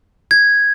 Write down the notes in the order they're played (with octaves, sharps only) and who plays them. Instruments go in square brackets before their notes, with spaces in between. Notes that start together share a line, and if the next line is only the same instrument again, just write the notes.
[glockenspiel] G#6